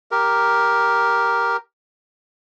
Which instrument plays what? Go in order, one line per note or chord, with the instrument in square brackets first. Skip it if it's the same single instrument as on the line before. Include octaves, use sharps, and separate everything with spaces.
[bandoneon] G4 A#4